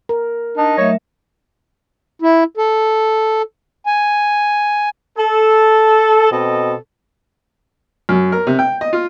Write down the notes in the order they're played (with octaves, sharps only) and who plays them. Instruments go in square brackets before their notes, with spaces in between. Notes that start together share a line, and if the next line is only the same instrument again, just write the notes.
[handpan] A#4
[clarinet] D4 [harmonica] D#4
[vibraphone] F#3 A3 E5 [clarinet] C#5
[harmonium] E4
A4
G#5
[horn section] A4
B2 C4 A4 D#5
[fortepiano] F#2
A#4
C3
G5
D#5
F4